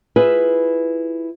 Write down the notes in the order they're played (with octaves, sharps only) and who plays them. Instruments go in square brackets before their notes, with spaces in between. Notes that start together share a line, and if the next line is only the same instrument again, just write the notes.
[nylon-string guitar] E4 F4 G#4 B4 E5